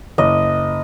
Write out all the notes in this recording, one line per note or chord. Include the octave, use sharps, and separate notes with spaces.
F#1 D#5 D6